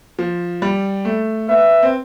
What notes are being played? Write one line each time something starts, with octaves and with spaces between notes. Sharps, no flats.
F3
G3
A3
B3 E5
C4